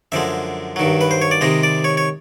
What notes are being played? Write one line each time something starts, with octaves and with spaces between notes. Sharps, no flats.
F#2 D3 F3 G#3 E5
G2 D#3 F#3
B4
C5
C#5
D5
C3 D#3 G#3 D#5
D5
C#5
C#5